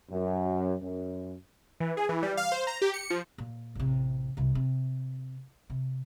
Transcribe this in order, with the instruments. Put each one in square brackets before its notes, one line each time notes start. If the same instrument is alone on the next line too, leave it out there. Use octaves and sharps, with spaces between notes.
[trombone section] F#2
F#2
[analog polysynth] E3
G#4
E3
G3
F5
C5
A#5
G4
C#7
F3
[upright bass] A#2
A1 C3
C2 C3
C3
C3